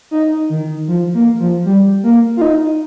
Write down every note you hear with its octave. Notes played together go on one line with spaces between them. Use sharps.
D#4
D#3
F3
A#3
F3
G3
A#3
F4
D#4